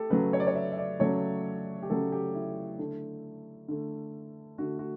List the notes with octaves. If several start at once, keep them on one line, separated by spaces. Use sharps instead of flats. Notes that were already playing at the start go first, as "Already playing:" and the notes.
Already playing: A3 G4 A4
C#3 F#3 A3 B4
C#5
D5
C#5
E5
E5
D5
C#3 F#3 A3 C#5
G4
C#3 F#3 A3 A4
G4
E4
D3 A3
D3 A3
D3 A3 F#4
F#4